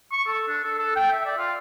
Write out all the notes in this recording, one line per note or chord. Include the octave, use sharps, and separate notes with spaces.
C#6
A4
D4
A4
A4
G5
E5
D5
F4